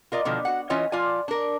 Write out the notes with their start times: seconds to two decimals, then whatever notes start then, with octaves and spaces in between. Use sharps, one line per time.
0.12 F4 A#4 D5 D#5
0.25 B2 D3 D#3 F3
0.45 F#4 F#5
0.70 E3 C#4 F4 C#5 D#5
0.92 F3 F4 D5 G#5
1.28 D4 A#4